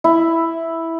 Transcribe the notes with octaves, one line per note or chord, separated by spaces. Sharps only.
E4